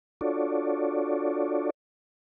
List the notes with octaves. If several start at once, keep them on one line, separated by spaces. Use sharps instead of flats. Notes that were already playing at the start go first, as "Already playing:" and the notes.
D4 F4 F#4 A4 C#5 D5